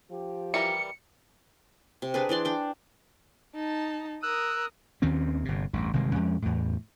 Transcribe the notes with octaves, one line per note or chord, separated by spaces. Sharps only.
F3 G4
E3 G3 A#4 C#7
C3
D4 G#4 B4
E3 D4 D5 C6
D4 G5
D#4 A5
A#4 D#6 E6 F#6
D#2 D#3 C4 C#4
G1 C3
A1 E2 G2
G1 C3 D#3 G#3
F2 F3 G#3 C#4
E2 A2